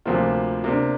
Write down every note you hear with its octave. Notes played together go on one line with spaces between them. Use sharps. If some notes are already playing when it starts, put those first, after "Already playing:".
D2 C3 F3 A#3 F4
C3 A#3 D4